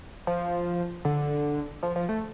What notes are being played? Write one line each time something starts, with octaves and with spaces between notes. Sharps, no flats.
F3
D3
F3
F3
A3